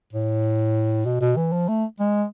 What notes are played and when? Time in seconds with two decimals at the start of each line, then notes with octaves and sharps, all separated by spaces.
0.13 A2
1.06 B2
1.21 B2
1.37 E3
1.53 F3
1.68 A3
2.00 G#3